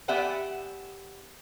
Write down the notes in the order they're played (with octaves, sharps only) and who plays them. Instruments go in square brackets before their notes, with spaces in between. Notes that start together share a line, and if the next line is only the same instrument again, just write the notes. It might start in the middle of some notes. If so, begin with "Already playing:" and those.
[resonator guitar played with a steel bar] B3 G4 D5 E5 F#5 G#5